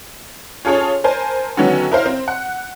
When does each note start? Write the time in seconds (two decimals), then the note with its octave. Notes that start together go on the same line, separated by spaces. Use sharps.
0.65 C#4 F4 G#4 A4 C#5
1.04 A#4 C5 G#5 A5
1.57 D3 D#3 F#3 B3 C#4
1.92 E4 A#4 C5 F5
2.06 C4
2.28 F#5